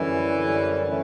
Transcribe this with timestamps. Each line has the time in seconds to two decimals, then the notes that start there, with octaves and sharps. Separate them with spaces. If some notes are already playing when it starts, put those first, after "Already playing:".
Already playing: F#2 D3 E3 G3 C#4
0.34 F#2 D3 G3 C#4
0.86 E3 A3 C#4 E4 B4